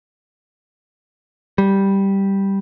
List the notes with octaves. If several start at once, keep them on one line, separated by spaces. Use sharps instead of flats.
G3